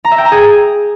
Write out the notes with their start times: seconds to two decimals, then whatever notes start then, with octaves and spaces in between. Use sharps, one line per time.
0.05 A#5
0.11 E5
0.18 G5
0.25 A#5
0.32 G#4